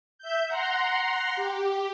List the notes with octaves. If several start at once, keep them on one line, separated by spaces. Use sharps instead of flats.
E5 G6
F#5 A#5 C6
G4